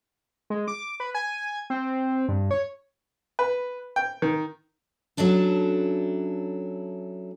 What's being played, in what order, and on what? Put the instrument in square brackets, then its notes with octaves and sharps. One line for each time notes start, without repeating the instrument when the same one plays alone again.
[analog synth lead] G#3
D6
B4
G#5
C4
G2
C#5
[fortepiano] B4
G5
D#3
[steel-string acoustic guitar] F#3 A3 C#4 D4 E4